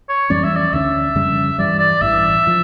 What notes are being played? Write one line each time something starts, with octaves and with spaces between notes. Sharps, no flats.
C#5
F2 E3 G3 C#4 D5
E5
D5
D2 D3 F3 C#4 E5
F2 C#3 G3 C#4
G2 E3 G3 D5
D5
A1 G2 E3 E5
C#3 F3